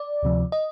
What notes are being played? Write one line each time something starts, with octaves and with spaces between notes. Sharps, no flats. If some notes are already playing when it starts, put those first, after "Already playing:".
Already playing: D5
D2 C3 F3
D#5